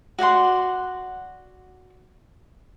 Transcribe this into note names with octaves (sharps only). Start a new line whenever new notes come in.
F#4 D5 F#5 C6